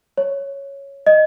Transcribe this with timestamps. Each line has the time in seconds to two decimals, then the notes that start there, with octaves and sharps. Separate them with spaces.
0.18 C#5
1.07 D#5